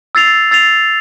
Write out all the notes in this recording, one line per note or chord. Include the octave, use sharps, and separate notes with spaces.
E6 A6 C7 F7
E6 A6 C7 F7